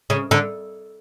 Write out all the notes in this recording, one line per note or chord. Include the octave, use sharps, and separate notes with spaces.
C#3
D3